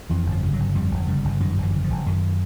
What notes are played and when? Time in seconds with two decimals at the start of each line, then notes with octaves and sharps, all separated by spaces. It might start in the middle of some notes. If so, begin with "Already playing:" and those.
0.10 F2 E3
0.26 G1
0.32 F3
0.42 C#3
0.53 F#3
0.59 G1
0.75 F2 G3
0.91 G1
1.08 C#3 G3
1.25 G1
1.40 F#2 D#3
1.58 G1 E3
1.74 C#3
1.84 F3
1.90 G1
2.06 F#2 D#3